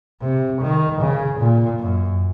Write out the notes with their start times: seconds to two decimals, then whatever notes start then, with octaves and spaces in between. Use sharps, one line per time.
0.21 C3
0.61 D#3
1.01 C#3
1.39 A#2
1.79 F#2